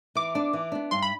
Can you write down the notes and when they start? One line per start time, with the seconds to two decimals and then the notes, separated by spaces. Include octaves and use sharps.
0.15 E3 D6
0.35 B3 D4
0.53 E3
0.72 B3 D4
0.91 G2 C6
1.02 B5